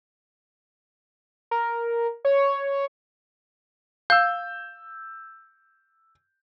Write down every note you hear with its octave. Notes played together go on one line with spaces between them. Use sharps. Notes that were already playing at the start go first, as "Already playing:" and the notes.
A#4
C#5
F5 E6 G6